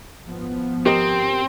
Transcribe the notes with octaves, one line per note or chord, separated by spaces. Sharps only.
G#1 F3 B3
C4 G4 A#4 D#5